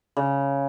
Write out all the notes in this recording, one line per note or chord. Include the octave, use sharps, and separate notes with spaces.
C#3